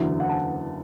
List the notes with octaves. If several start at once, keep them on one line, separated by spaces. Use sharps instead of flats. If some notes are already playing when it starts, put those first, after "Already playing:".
Already playing: F#1 E2 D3 F#3 E5
F#5
A5